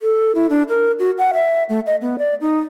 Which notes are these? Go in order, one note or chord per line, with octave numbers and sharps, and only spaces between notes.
A4
E4
D4
A#4
F#4
F#5
E5
A3
D#5
B3
D5
D#4